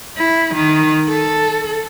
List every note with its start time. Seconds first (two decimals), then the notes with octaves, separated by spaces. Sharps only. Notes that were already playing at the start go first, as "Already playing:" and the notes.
0.17 E4
0.55 D#3
1.09 A4